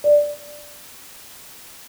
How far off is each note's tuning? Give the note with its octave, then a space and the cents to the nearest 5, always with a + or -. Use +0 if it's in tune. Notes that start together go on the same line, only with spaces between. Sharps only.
D5 +0